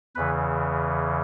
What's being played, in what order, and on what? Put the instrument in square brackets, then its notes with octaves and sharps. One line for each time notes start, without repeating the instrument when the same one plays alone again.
[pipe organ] E2 C#3 E3 B4